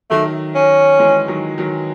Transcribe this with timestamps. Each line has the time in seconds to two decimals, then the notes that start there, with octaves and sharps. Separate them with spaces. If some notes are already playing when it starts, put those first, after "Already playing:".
0.10 D#3 F#3 A3
0.55 C#4
0.99 E3 G#3
1.28 D#3 F#3
1.58 D#3 F#3